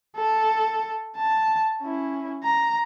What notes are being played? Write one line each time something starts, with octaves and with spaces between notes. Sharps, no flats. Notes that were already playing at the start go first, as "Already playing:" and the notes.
A4
A5
C#4 E4
A#5